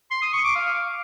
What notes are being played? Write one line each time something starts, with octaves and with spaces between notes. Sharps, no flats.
C6
D#6
C#6
D6
F5